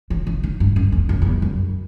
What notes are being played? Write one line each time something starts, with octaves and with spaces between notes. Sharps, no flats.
E3
E3
D#3
G2
F#2
E2
F#2
F#2
E2
F#2